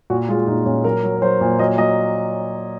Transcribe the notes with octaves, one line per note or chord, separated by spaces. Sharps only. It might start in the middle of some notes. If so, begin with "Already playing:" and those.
A#2 F#4
G#3 F4
A#2 D#4
A#2 C#4
F#3 A#4
F#3
C#5
F#3 C5
A#2
F#3 D#5
F#3 D#5